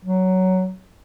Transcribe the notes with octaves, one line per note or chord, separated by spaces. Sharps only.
F#3